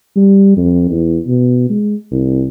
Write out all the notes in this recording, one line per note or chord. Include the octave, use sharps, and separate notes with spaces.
G3
F2
E2
B2
G#3
C2